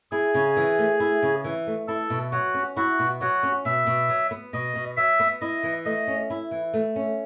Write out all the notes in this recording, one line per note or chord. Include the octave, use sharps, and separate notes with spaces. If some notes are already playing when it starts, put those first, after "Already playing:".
E4 G#4
C#3
E3
A3
E4
C#3
E3
A3
E4 A4
B2
F#3 F#4
C#4
E4 F#4
B2
F#3 F#4
C#4
B2 E5
B2
F#3
B3
B2 D#5
B2
F#3 E5
B3
E4 D#5
E3
A3 D#5
C#4
E4
E3
A3
C#4